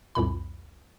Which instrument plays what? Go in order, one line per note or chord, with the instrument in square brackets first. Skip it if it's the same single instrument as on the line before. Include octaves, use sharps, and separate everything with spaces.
[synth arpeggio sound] C2 F2 A#2 B5